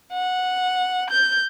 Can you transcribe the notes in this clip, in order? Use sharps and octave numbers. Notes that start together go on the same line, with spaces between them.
F#5
G6